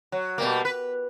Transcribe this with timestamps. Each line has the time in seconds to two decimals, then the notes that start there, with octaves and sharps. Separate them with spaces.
0.12 F#3
0.38 B2 G3 A#3
0.65 B4